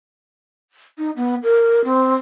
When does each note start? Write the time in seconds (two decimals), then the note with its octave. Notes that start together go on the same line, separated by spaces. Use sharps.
0.98 D#4
1.16 B3
1.43 A#4
1.84 C4